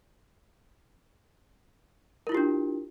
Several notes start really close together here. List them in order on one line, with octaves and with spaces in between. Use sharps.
A#4 E4 F4 G4 D4